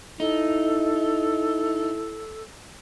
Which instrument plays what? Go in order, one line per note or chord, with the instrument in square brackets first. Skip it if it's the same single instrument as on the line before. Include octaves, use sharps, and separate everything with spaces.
[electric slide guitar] D#4 [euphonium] E4 [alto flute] A4